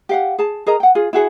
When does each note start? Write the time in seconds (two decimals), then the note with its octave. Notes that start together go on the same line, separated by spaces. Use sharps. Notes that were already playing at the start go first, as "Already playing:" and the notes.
0.09 G4 F5 F#5
0.38 G#4 A5
0.66 G#4 A#4 D#5 A#5
0.80 F#5 G5
0.95 F4 G#4
1.13 E4 F#4 G#4 F#5